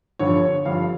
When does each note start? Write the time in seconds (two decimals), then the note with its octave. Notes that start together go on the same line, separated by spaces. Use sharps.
0.19 G1 G2 D3 F3 C#5
0.65 G1 G2 D3 F3 F5